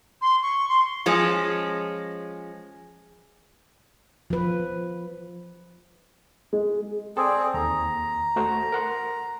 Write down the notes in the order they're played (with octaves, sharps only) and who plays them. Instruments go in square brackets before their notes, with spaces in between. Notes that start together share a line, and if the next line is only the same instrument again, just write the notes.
[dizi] C6
C#6
C6
[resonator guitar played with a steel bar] F3 G#3 C#4
[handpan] F3 B4
[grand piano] G#3
[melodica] C4 G#4 [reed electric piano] A4 D5
[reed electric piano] D#2 [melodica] A#5
[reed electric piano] A3 F#4 C5
A#4 F#5 C6